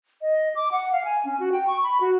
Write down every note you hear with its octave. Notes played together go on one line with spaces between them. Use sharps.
D#5
D6
F#5
F5
G#5
C#4
F#4
G5
C#6
B5
F#4